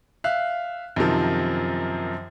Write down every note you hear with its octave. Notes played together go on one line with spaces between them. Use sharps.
E5 F5 F#6
F#2 C3 D#3 F3